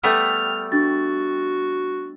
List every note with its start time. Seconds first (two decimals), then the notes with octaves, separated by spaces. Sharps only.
0.03 G3 A3 B3 F6
0.72 D4 F#4 A6